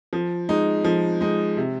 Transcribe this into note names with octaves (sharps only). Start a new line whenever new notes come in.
F3
G#3 D#4
F3
G#3 D#4
C3